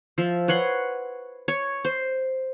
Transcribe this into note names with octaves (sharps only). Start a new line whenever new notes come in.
F3 E5
B4 C#5 F#5 C6
C#5
C5